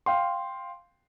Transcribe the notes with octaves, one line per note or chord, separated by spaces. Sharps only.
F5 G5 C6